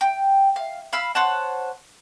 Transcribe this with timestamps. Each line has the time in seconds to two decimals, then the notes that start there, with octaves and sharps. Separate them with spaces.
0.01 G5
0.56 F5
0.93 F5 B5 E6 F6
1.15 C5 C#5 F#5 A5